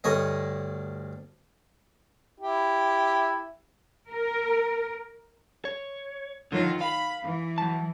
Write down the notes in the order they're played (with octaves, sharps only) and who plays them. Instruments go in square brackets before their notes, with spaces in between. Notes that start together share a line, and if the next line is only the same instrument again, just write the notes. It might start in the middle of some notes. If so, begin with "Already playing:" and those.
[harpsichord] D2 G2 C#5 D#5
[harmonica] E4 G4
[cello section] A#4
[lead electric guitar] C#5
[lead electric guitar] D3 F3 [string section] D#3 F#3 F4
[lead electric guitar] F5 [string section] B5
[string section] E3
[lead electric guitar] F#3 A5